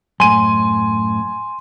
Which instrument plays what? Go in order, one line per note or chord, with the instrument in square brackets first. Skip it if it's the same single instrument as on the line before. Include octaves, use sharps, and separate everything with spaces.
[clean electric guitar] F#2 A2 [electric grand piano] G#5 D#7 [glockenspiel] C6